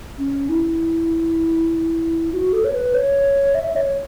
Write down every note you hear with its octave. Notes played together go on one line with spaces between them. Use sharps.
C#4
E4
F#4
A4
C#5
B4
C#5
E5
E5
C#5